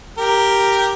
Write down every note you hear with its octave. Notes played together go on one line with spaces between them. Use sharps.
G4 A#4